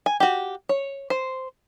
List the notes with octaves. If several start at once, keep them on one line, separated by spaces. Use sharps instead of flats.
G#5
F#4 G4
C#5
C5